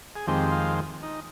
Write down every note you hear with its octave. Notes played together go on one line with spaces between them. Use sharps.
G#4
F2 D#3 G#3 C4 G4
F4
D#4